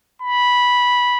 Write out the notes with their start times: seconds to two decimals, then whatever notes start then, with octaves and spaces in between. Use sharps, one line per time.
0.22 B5